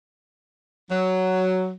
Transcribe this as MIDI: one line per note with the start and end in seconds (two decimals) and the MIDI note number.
0.90 1.72 54